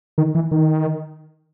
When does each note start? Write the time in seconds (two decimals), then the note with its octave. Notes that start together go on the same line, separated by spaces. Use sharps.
0.18 D#3
0.35 E3
0.51 D#3